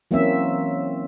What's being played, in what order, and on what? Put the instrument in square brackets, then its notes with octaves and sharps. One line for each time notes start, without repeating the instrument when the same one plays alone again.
[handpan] E3 F#3 A#3 C4 C#4 E5